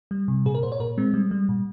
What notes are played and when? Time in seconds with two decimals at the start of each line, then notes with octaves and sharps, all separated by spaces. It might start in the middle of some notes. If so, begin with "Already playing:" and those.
0.11 G3
0.28 C3
0.45 A#2 G#4
0.55 A#4
0.63 A#2 C5
0.72 C#5
0.80 A#2 A#4
0.98 G#3 C4
1.14 G3
1.31 G3
1.49 A#2